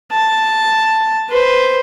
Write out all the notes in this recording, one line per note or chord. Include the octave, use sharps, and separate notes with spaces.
A5
B4 C5